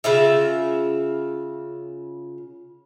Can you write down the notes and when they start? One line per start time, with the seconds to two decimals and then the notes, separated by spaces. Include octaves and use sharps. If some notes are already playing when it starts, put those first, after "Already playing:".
0.04 C#3 F4 E5